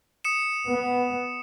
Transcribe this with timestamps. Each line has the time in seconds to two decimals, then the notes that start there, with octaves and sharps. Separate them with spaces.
0.24 D#6 C#7 E7
0.68 B3